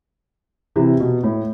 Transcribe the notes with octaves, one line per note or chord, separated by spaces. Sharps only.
C3 E3
B2
A2